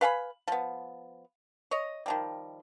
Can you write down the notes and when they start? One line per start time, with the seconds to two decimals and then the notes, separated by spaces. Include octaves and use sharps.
0.01 B4 F5 G#5 B5
0.48 F3 B3
1.71 C#5 D#5
2.06 D#3 F3 G3